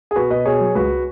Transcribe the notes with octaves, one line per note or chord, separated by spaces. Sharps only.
G#4
B2 F#4 B4
B2 B4 D#5
B2 G#4 C#5
F#3
C#2 F#4 B4